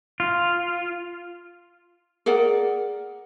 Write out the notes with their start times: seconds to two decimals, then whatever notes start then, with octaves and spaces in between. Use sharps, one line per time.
0.20 F4
2.26 G#4 A#4 D5 F#5